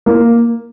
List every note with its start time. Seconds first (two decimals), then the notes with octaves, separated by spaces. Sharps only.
0.06 A#3